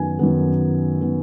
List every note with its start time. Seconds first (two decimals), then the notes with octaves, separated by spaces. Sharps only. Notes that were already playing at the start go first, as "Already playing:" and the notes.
Already playing: F#2 D#3 B3 G#5
0.19 F#2 D#3 B3
1.01 D#3 B3